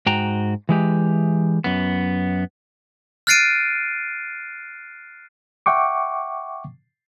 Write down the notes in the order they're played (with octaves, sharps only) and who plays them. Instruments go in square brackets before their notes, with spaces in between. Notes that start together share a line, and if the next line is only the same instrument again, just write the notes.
[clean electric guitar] G#2 F#4 G5 A#5
E3 G#3 G4
F#2 B3
[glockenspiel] F6 F#6 A6 C7 D7 D#7
[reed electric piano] E5 F#5 G5 C#6 D6